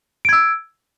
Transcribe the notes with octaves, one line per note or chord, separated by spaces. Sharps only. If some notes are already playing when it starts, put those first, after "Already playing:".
E6 G#6 D7